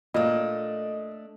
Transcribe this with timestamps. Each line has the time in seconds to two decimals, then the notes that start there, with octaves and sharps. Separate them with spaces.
0.14 A#2 A3 D4 D#5